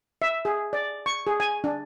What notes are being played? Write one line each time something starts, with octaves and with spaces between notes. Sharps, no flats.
E5
G#4
D5
C#6
G#4
G#5
D4